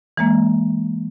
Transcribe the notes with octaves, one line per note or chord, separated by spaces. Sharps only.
E3 G#3 A#3